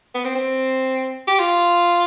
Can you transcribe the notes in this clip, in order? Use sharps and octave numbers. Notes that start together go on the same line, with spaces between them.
B3
C4
C4
G4
F4